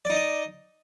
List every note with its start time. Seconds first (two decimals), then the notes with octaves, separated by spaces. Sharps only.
0.05 D5
0.10 D#4
0.15 D#5